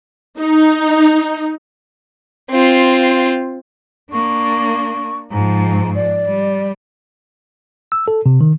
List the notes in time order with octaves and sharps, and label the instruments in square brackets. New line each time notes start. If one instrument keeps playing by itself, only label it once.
[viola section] D#4
[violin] C4 F4
[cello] A#3 D4 [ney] C#6
[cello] G#2 F3 [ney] A#5
[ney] D5
[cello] G3
[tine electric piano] E6
A4
C3
D#3